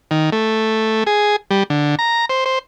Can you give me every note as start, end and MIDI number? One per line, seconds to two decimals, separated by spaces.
0.11 0.30 51
0.32 1.04 57
1.07 1.36 68
1.51 1.63 55
1.70 1.95 50
1.99 2.25 82
2.30 2.44 72
2.46 2.59 72